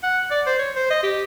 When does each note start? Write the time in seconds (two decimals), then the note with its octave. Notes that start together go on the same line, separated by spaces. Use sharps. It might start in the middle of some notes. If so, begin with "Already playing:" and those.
0.03 F#5
0.31 D5
0.47 C5
0.59 C#5
0.76 C5
0.91 D#5
1.03 G4